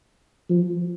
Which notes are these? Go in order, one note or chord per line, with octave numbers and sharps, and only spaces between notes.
F3